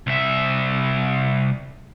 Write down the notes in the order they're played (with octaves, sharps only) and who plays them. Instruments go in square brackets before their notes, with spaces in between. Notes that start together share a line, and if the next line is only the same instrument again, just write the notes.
[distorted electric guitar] C2 E5